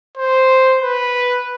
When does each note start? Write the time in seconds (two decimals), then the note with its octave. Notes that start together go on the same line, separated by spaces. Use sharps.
0.17 C5
0.81 B4